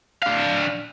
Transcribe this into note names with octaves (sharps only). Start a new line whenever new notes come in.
D4 F5